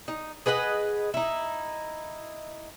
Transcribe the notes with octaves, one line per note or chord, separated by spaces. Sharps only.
D#4
G#4 B4 D#5 F#5
D#4 E4